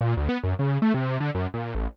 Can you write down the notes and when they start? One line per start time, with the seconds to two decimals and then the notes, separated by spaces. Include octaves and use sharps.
0.01 A#2
0.17 D2
0.29 B3
0.43 F#2
0.59 C#3
0.82 A3
0.94 C3
1.20 D3
1.35 F#2
1.54 A#2
1.75 A1